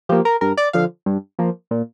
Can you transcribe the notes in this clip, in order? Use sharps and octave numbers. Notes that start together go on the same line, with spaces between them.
F3 A#3 G4
A#4
G2 A#4
D5
D3 F3 F5
G2
F3 A#3
A#2